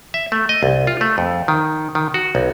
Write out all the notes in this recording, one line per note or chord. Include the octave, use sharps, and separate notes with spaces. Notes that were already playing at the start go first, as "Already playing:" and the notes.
E5
A3
D#5
C2
F4
A3
F2
D#3
D#3
F#4
B1